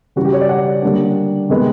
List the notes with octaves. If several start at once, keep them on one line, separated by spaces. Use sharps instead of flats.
C#3 E3 G3 F#4
G4
C#5
D5
F#5
D3 G3 A#3 D4
C3 D#3 G#3 B3